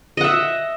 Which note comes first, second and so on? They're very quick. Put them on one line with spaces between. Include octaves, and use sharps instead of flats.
D#5 F#5 E5